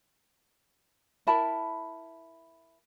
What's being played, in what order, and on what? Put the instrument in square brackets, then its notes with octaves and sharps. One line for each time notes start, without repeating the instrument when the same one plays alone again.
[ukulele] E4 A#4 A5 B5